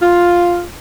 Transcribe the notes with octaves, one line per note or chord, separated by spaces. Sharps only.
F4